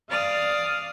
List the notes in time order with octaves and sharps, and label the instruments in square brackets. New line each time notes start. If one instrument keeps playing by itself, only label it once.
[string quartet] D5 F5 D#6 F6